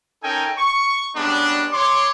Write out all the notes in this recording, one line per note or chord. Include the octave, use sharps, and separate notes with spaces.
C#4 D#4 A4 A#4 G5 G#5
C#6
G3 G#3 B3 C#4 D4
C#5 C6 D6